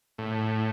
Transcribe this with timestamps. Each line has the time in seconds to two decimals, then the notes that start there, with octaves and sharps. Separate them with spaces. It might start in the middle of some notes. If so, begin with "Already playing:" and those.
0.18 A2